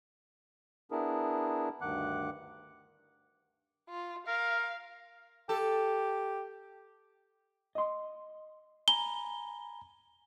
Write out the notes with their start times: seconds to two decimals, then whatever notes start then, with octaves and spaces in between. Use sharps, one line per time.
0.91 B3 D4 E4 G#4 A#4
1.81 D2 G2 D#3 F#5 D6 F#6
3.89 F4
4.27 A#4 F5
5.49 G4 A4
7.75 D#5 C6
8.88 G#5 A#5 B5 G7